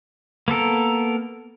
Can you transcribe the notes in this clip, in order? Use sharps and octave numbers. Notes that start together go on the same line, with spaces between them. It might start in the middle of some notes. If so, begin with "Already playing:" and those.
A#3 B3 A4 A#4